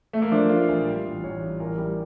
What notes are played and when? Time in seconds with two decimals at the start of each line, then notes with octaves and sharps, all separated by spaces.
0.13 A3
0.22 A#3
0.31 F3 D4
0.49 A3 F4
0.69 A#1
0.87 G3
1.05 A1
1.23 A1 C#5
1.42 G3
1.60 A1 A#4
1.78 G3